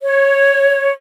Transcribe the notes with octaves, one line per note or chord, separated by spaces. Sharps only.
C#5